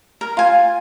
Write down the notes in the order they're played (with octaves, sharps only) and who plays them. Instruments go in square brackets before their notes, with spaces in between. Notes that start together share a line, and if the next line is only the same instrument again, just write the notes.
[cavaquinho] A#4
F4 G#5